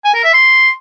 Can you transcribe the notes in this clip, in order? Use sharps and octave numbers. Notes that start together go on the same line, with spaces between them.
G#5
A#4
E5
C6